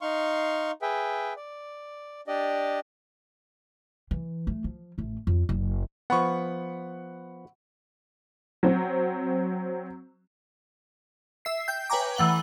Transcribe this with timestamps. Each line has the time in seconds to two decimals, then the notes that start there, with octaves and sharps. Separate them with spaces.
0.01 D#4 F5 C6 C#6
0.82 G#4 B4 E5 G5
1.36 D5
2.27 D4 G4 D5 D#5
4.11 E3
4.47 A3
4.64 F3
4.98 A1 A3
5.27 F2
5.49 F#1
6.10 F3 B3 F#5 B5 C#6
8.63 F#3 C4
11.45 E5 C7
11.68 G5 G6
11.90 B4 C#5 G5 G#5 A#5 D6
12.16 E3 A3 F#5 F#7 G7